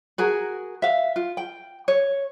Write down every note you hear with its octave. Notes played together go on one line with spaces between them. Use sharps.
F#4 G#4 A#4
E5 F5
F4
G5
C#5